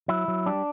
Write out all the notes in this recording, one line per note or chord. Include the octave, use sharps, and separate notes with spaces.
F#3 E4
F#3
G3 D4